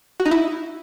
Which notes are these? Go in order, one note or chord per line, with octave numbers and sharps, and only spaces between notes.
F#4
D#4
E4